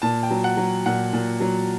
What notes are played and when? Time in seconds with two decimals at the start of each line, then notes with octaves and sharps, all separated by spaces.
0.02 A#2 A5
0.23 G5
0.30 F#3
0.44 F#5
0.57 F#3
0.86 A#2 F#5
1.13 A#2
1.40 F#3